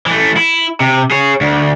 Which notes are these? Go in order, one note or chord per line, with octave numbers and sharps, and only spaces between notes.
E3 A3
E4
C3
G#4 C#5
D2